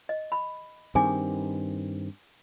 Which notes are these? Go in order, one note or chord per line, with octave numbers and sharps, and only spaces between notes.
D#5
B5
G2 D#3 C4 G#4 G#5 D6